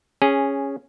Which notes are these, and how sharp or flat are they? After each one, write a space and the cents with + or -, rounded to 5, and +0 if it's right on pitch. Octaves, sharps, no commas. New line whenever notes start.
C#4 +0 G#4 -10